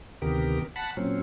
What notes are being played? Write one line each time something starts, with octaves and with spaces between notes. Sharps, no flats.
D2 C3 D#3 B3 G4 A#4
F#5 A5 B5
A#2 F#3 C4 C#4